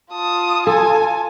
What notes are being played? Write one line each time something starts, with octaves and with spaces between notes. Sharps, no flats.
F4 A5 D#6
A4 G#5